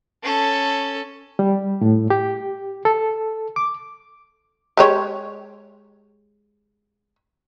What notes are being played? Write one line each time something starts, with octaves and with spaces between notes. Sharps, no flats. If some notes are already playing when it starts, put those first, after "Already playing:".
C#4 A4
G3
A2
G4
A4
D6
G#3 G4 C#5